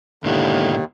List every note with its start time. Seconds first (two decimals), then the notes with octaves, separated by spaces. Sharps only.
0.24 D#2 G#2 B2 D3 E4